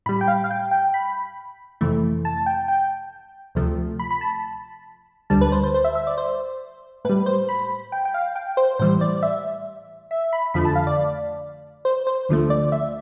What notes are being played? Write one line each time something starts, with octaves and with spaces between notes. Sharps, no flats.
A2 G3 B5
G5
F5
F5
G5
G5
B5
F2 C3 E3 A3
A5
G5
G5
D2 C3 F3 A3
B5
B5
A5
D2 D3 G3 A5
B4
C5
C5
C5
E5
E5
D5
C5
A2 G3 B4
C5
B5
G5
G5
F5
G5
C5
A2 E3 G3 C5
D5
E5
E5
B5
F2 D3 F3 A3 B5
A5
F5
D5
C5
C5
D2 D3 F3 A3
D5
E5